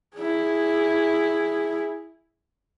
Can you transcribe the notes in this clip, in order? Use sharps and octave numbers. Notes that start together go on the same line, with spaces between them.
E4 G#4